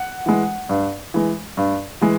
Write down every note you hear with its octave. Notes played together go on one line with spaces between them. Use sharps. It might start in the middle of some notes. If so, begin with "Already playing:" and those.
Already playing: F#5
E3 G#3
G2
E3 G#3
G2
E3 G#3